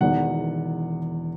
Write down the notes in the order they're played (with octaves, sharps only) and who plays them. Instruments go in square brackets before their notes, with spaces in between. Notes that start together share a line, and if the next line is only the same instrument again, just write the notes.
[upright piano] E1 E2 D#3 F#5